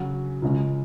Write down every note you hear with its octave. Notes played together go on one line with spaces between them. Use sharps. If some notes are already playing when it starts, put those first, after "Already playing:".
Already playing: C#3 F#3 C#4 F#4
C#2 C#3 G#3 C#4